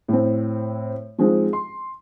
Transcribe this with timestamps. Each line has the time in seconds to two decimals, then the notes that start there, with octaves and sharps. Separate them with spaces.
0.08 A2 C4
1.18 F3 G#3 C4 D#4
1.53 C6